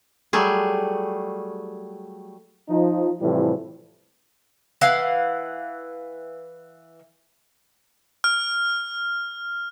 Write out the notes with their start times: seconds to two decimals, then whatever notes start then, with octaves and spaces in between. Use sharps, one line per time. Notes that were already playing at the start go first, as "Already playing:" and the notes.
0.33 F#3 G3 A3 G#4
2.69 F3 D#4
3.20 A2 C3 E3 F3 G3
4.81 E3 F5 F#5
8.24 F6